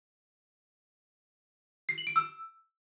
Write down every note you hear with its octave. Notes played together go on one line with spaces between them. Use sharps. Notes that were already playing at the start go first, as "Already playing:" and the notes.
C7
F#7
D7
E6